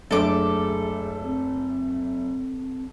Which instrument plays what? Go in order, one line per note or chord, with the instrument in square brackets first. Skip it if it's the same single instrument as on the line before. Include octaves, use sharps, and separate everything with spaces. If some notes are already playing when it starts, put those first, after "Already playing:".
[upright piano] F#1 A3 D4 [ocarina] G#4 [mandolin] A4 D6
[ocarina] C4